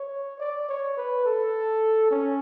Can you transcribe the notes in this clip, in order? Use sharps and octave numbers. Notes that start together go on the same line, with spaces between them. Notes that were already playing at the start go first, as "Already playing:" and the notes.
Already playing: C#5
D5
C#5
B4
A4
C#4